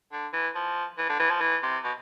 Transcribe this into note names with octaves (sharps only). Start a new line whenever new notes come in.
D3
E3
F3
E3
D3
E3
F3
E3
C3
B2